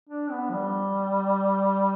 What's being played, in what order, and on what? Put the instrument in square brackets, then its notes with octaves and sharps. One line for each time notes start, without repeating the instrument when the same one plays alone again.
[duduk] D4
B3
F3
G3